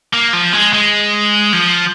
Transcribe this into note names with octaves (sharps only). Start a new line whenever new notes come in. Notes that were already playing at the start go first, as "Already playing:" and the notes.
A#3
F3
G#3
G#3
F3